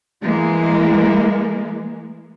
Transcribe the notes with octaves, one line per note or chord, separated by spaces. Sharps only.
E3 G#3 A#3